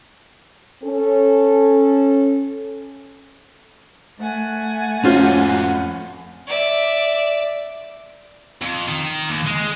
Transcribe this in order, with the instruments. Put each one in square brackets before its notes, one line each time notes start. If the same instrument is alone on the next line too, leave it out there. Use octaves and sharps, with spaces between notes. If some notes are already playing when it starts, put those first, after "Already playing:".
[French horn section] C#4 A4
[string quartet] A3 F#5 G#5
[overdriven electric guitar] F2 F#4 [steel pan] C#4 [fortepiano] F4 C5
[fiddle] D5 E5
[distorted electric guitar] F2
D#3
D#2
G#3